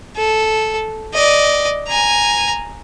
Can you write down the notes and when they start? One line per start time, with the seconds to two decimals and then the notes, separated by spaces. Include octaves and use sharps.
0.17 A4
1.14 D5 D#5
1.87 G#5 A#5